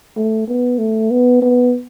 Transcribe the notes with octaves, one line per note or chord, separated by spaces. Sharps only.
A3
B3
A3
B3
B3